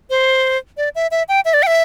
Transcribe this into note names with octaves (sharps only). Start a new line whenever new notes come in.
C5
D5
E5
E5
G5
E5
D5
G5
E5